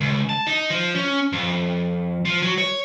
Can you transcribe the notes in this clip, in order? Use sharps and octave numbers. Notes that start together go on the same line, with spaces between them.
C#2
A5
D#4
F3
C#4
F2
F3
F#3
C#5